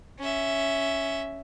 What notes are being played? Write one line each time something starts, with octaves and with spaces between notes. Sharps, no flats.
C#4 E5